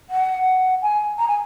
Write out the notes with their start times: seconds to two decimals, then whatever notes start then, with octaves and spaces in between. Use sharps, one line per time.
0.09 F#5
0.82 G#5
1.18 A#5
1.28 G#5